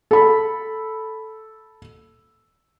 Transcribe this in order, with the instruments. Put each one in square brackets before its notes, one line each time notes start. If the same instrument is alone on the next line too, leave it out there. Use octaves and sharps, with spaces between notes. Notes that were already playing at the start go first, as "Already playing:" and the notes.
[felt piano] A4 B5